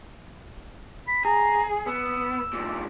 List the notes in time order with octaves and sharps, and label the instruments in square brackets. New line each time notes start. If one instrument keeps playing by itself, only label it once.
[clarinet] B5
[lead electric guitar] G#4 [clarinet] A#5
[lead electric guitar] B3 [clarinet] E6
[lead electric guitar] G2 A#2